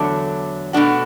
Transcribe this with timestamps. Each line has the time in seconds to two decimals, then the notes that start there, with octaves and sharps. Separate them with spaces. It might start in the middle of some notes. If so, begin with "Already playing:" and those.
Already playing: E2 D3 F#3 A3 D4
0.73 B2 A3 D4 F#4